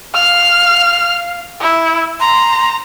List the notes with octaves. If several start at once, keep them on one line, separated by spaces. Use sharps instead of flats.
F5 F6
E4
A#5 C6